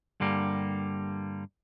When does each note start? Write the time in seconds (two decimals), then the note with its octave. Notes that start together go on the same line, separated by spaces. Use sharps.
0.20 G2 D3 G3 A#3